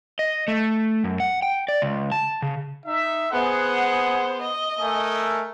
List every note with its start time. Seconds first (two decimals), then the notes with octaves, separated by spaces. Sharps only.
0.19 D#5
0.48 A3
1.04 F#2
1.20 F#5
1.42 G5
1.68 D5
1.82 C#2
2.12 A5
2.42 C#3
2.85 D#4 E5
3.31 B3 G#4 C5 F#5
4.42 D#5
4.80 A3 A#4 G#5